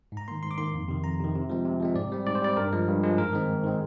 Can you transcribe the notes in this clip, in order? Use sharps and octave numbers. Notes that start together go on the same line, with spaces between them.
G#2
A#5
D#3 A#3 C6
G#2 C6
D6
D#3 A#3 C6
F2
C3 D#3
F2 A#5
C3 D#3
C3
F3 G#3 C4
C3
F3 G#3 C4
G#2 D5
G3 C4
G#2 D5
C5
G3 C4 D5
G2 A#4
F3 G#3
G2
F3 G#3
G#2 A#4
D#3 G#3 C4
G#2
D#3 G#3 C4